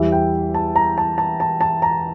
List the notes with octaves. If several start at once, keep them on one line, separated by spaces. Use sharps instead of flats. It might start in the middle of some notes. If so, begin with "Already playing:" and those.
Already playing: E2 E3 G3 E5
G5
A5
A#5
A5
A5
A5
A5
A#5